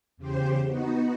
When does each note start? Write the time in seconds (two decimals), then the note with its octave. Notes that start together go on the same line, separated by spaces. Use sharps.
0.17 E2 C#3 G4 C5
0.66 B3 D#4 F#4